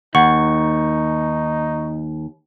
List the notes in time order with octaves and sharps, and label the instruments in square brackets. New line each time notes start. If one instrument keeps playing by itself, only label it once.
[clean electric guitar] D#2 [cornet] D#4 [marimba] F#5 [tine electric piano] C#6